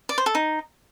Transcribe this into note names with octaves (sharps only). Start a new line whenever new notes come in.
D5
C5
A4
D#4